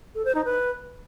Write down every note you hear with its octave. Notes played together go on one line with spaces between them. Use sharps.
A4
C5
D#4
B4